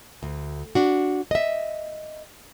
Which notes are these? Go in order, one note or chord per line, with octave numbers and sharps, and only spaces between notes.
D2
D4 F#4
D#5 E5